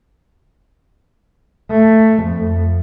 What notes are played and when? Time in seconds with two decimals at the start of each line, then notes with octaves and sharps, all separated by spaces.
1.71 A3
2.24 F2